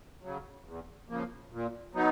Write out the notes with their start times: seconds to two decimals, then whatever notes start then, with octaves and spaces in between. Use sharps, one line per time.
0.23 C#3 F#3
0.65 E2
1.09 C#3 F3 A#3
1.52 A#2
1.94 F#3 B3 D#4